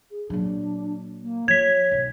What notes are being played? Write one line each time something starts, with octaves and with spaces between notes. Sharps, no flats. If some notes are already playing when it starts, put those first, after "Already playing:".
G#4
A#2 F#3 D4
A#3
F3 C#5 G#6 B6
B1